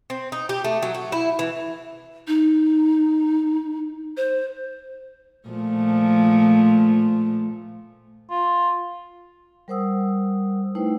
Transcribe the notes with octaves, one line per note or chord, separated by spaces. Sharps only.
C4
D#4
G4
A3
F#3
F#4
E4
E3
D#4
C5
A#2 F3 A3
F4
G3 A#4 C5 F#5 D#6 E6
A3 D#4 E4 B4 C5 G5